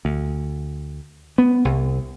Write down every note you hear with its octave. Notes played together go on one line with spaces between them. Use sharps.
D2
B3
C2